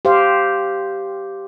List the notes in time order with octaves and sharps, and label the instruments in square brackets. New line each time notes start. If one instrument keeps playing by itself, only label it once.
[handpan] G4 C5 F5